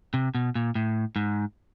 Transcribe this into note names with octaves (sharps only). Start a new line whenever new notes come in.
C3
B2
A#2
A2
G#2